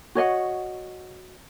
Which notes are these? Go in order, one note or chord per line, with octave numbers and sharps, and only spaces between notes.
F#4 C#5 D#5 F#5